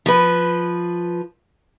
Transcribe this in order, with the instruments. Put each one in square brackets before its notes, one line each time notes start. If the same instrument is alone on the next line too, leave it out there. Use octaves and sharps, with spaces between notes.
[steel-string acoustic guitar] F3 B4